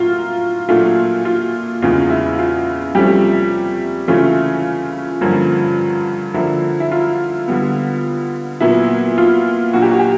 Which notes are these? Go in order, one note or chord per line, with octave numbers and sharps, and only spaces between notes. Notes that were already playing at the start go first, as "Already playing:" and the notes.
Already playing: A2 F#3 A#3 F4
A#2 F#3 A3 D4 F4
F4
E2 C#3 E3 G#3 F4
E4
F4
C3 F3 G3 A3 C#4 G4
C#3 E3 A3 C#4 F4
G2 D3 F3 A#3 C#4
D3 F3 A#3 D4 E4
E4
F4
D3 G3 B3
A#2 F#3 B3 E4
F4
A#2 F#3 A#3 D4 F#4
G4
F#4
G4